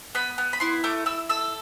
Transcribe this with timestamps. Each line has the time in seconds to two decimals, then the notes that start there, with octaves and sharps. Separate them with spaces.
0.15 B3 B5
0.38 B3
0.53 B5
0.60 E4 C6
0.84 A3 D6
1.06 E4 E6
1.29 A4 E6